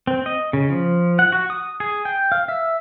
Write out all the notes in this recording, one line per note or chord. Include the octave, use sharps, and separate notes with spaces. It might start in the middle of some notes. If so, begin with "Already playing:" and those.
C4
D#5
C#3
F3
F#5
F#4
D#6
G#4
G5
F5
E5